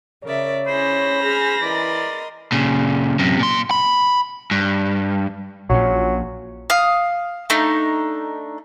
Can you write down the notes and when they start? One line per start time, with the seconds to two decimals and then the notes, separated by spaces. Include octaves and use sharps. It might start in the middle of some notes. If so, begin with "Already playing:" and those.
0.24 C#3 A#4 C#5 D5 E5
0.67 C#4 E4 G#4 C5 B5 A#6
1.23 G#4 G#5 F6
1.62 E3 A#4 D5 D#5 C6
2.52 A#2 C#3
3.19 F#2 C3
3.39 A#2 C6
3.71 B5
4.51 G2
5.70 A#1 A#2 F#3 C#4
6.70 F5 D#6
7.50 A3 D4 D#4